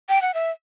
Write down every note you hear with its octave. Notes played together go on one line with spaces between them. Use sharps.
G5
F#5
E5